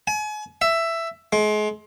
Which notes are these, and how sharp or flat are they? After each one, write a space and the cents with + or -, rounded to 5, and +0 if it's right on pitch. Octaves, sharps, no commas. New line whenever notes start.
G#5 +35
E5 +10
G#3 +35